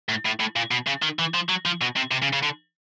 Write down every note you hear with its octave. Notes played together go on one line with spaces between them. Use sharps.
A2
A2
A2
A#2
B2
C#3
D#3
E3
F3
F#3
F3
B2
C3
C3
C#3
C#3
D3